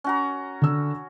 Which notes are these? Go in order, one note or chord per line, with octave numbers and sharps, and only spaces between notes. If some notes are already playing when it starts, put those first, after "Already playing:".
C#4 F#4 A#5
D3 E6